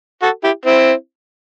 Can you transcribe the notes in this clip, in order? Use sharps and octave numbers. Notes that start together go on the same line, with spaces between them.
F#4 A4
E4 G4
C4 E4